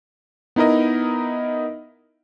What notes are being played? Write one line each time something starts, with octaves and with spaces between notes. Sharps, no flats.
B3 D#4 E4 A#4 D#5